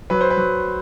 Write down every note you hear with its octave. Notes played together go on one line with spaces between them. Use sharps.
F#3 B4
C5
B4
F#3